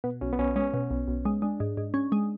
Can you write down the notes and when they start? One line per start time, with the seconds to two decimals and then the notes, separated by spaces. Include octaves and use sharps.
0.04 B2 B3
0.21 B1 C#4
0.33 B3
0.39 B1 C#4
0.56 G#3 C#4
0.74 B2
0.91 B1
1.08 B1
1.25 G#3
1.42 G#3 D4
1.60 G#2
1.77 G#2
1.94 C#4
2.12 G#3